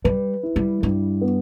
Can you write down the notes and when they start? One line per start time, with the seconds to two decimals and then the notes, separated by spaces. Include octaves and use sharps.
0.04 G3 B4
0.43 E4
0.56 G3
0.82 G2 G3
1.21 B3